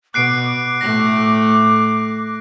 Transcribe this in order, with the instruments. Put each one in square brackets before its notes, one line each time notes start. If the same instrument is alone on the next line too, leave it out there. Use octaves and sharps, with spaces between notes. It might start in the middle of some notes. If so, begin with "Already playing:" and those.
[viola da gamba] B2 [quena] D6 [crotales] F#6 C7 D7
[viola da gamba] A2 A3 [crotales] A#6